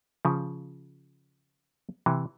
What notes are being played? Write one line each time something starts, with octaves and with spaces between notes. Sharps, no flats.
C#3 F3
C3 E3